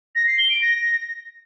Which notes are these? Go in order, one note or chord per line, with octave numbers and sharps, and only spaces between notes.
A#6
C7
G7
D7
A#6